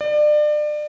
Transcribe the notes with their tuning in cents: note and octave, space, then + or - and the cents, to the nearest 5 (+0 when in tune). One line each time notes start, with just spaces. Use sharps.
D5 +30